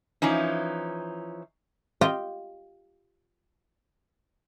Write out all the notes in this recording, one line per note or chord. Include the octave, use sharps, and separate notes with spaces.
E3 F3 C#4 D#4
F4 G4 D#5 G5